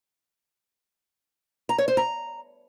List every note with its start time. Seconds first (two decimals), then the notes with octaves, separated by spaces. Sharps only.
1.69 A#5
1.78 C#5
1.88 C5
1.97 A#5